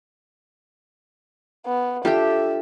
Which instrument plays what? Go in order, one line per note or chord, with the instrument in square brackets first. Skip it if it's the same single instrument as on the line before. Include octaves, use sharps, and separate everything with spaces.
[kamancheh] B3
[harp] D4 F4 A4 [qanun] G4 G5 [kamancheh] E5